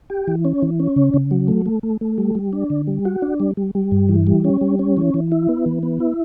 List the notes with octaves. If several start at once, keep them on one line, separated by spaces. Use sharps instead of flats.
G4
E3
C#4
E3
C#4
C#3
C#3
F#3
A3
A3
A3
A3
G3
G3
D4
D3
G3
F#4
D4
G3
G3
G3
G2
E3
G3
C#4
G3
C#4
E3
E3
E4
B3
E3
B3
E4